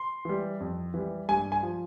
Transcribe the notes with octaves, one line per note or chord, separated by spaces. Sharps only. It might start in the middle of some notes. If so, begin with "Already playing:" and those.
Already playing: C6
E3 G3
F2
E3 G3
G2 G#5
G#5
F3